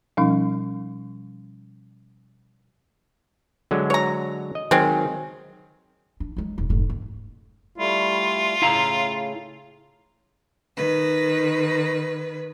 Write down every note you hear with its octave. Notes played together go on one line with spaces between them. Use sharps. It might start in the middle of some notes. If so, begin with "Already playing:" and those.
B2 F3 G3 C#4 D#4
D3 F#3 G#3
C#5 A#5
D#5
D#3 F#3 G#3 C4
D4
F#3 G#3
D#1
F1 G#2
F#1
G3 A3 E4 F4
A2 C#3 E4 F5 A#5
D#3 B4